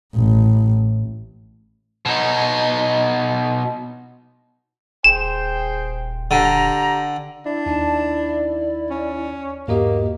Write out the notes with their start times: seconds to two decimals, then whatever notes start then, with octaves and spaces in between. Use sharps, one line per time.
0.15 A1
2.06 B2 D#4
5.04 D#1 G#4 C5 G5 E7
6.31 D3 G4 A#5
7.46 D4 E4
7.66 D#2 D#4 A5
8.27 D5
8.91 C#4
9.68 E2 G#2 A#3 F#4 G4 D#5